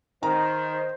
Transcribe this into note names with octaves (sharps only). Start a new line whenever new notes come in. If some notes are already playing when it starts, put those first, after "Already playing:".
D#3 C5 A#5